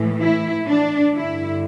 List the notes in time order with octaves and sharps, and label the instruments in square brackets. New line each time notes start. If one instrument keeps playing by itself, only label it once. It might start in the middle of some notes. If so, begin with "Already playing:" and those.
Already playing: [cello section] A2 E3
E4
D4
G2 D3 E4